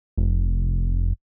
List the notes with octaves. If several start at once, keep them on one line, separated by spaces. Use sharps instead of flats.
F1